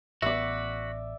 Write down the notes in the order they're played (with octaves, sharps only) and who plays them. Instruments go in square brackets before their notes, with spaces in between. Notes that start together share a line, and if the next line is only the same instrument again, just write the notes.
[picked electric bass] A1 B3 [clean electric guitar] F#4 B4 [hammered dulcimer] D5 E5